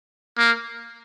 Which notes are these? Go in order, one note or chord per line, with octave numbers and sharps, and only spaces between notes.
A#3